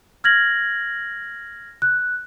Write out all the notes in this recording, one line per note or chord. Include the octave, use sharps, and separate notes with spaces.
F6 G#6 A#6 F#7
F#6